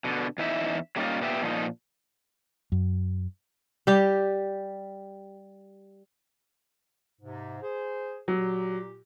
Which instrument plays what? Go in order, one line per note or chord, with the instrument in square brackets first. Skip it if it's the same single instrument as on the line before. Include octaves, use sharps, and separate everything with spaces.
[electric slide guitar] B2 D3
E2 E3 D#4 E5
F#3 G3 A#3 C#4 D#4 F4
A#2 B3 G4 E5
A#2 F3 D#4
[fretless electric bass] F#2
[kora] G3 G4
[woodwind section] G#2 C3
G#4 C5
[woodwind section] A#2 G4 [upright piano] F#3